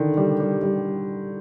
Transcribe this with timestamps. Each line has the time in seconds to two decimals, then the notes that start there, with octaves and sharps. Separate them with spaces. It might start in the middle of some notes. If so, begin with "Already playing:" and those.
Already playing: D3 D#3
0.17 G3
0.40 G3
0.63 G3